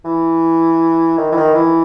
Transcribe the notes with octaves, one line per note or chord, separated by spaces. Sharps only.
E3
D#3
E3
D#3
E3